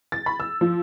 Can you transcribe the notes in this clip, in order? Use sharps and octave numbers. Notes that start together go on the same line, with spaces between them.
A6
B5
E6
F3